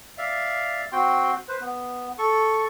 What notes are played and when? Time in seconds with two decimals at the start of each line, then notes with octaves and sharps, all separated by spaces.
0.18 D5 E5 F5
0.92 C4 F#4 G5 C6
1.48 B4 C5
1.61 B3
2.18 A4 C#6